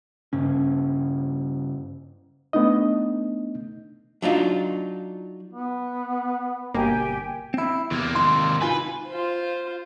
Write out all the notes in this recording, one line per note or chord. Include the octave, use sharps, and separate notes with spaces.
G2 C#3 C#4
A3 B3 D4 D#4 D#5
F#3 D4 D#4 F4
B3
G1 B2 A#3 G4 G5 G#5
C4 E4
E2 C3 A#3
G#2 D#3 C6
D#4 F4 B4 G#5
F4 C5